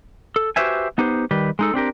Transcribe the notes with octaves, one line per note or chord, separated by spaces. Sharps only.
A4
F#4 G4 B4 C5 E5 G#5
B3 D#4 G4 B4 C5
D#3 G3 G4 B4
G#3 D#4 A4
C4 D4 G4 A#4